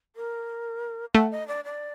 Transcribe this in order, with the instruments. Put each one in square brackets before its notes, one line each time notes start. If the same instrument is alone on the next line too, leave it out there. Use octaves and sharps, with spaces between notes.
[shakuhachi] A#4
[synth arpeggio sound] A3 [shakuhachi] F#5
[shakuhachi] D#5
D5
D5